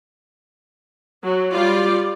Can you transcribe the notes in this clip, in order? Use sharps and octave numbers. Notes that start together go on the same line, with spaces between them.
F#3
G3 F4 D5